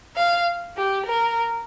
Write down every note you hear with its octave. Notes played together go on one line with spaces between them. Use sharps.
F5
G4
A#4